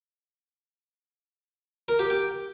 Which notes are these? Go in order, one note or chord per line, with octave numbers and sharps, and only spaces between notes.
A#4
G4
G5